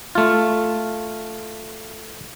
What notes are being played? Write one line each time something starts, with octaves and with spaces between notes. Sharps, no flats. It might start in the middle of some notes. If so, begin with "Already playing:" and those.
A3 F4